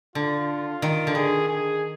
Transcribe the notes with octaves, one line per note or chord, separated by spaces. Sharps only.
D3 F4
D#3
D3
D#3 G#4
G#4